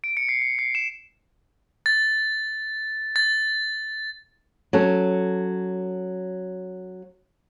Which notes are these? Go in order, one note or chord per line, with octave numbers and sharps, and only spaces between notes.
D7
C#7
C7
C#7
C7
E7
A6
A6
F#3 C#4 A4